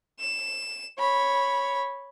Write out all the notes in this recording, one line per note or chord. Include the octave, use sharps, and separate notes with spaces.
E7
C#5 B5